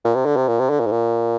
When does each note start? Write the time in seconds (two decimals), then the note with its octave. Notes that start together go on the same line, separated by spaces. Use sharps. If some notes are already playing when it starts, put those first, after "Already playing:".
0.05 A#2
0.15 C3
0.26 D3
0.37 C3
0.48 A#2
0.59 C3
0.70 D3
0.80 A#2
0.86 G#2
0.92 A#2